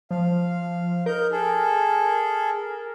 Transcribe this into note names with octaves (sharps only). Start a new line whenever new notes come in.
F3 F5
D#4 A#4 G6
G#4 A4